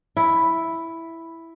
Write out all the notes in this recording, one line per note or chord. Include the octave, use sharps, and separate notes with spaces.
E4